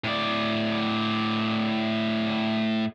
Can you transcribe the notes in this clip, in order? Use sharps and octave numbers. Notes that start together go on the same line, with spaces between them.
A2 D5